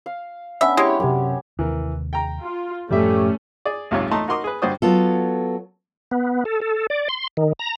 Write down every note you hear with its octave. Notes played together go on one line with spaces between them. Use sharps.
F5
B3 C#4 D4 E5
G#3 E4 G4 C#5
F#2 C3 G4 C#5
D#2 C3 E3 A#4
G5 A#5
F4
F#2 A2 F3 G3 A3 C#4 G4 E5
G#4 D5
B1 G#2 C3 F4 C#5
A3 D#4 A5 A#5 C6
D#4 F#4 A#4 C6 D6 D#6
G#4 B4
G2 D3 F#4 C5 D5 D#6
F#3 B3 F4 A4
B3
A4
A4
D5
C6
D#3
A#5